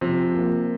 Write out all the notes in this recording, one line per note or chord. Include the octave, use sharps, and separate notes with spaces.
C3 F3
A#3